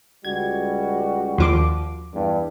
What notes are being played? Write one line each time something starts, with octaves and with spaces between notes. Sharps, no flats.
C#2 G3 F#4 G#6
D#2 F3 D6
E2 G2